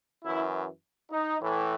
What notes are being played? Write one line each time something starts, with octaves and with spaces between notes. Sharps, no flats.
F#2 E3 E4
D#4
A2 E3